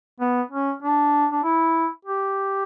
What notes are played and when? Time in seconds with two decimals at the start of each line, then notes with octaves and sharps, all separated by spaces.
0.20 B3
0.51 C#4
0.83 D4
1.32 D4
1.44 E4
2.05 G4